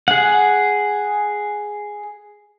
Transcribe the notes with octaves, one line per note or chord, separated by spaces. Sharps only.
G#4 F#5